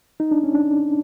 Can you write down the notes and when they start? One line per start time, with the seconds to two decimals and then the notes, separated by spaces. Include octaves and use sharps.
0.20 D#4
0.31 D4
0.44 C#4
0.55 D4